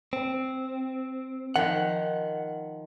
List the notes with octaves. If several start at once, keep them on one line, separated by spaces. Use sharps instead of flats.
C4
D#3 F3 F#5